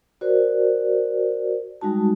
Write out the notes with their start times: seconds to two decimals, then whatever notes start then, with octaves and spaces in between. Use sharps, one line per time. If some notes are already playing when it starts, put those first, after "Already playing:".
0.21 F#4 A#4 C5 D5
1.81 G3 G#3 D#4 F#4 A5